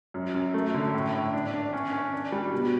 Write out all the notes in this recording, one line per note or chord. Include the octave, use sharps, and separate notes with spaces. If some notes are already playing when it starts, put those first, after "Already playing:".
F#2
F#2
A3
D3
A2
A2
D4
D4
C#4
C#4
D4
G3
B2